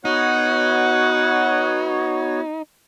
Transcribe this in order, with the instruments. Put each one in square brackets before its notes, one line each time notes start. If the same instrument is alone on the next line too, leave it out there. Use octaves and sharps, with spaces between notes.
[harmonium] B3 F#4 C#5 [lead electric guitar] D#4 [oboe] F#5